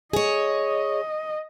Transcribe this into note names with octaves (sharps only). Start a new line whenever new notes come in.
G#4 C#5 D#5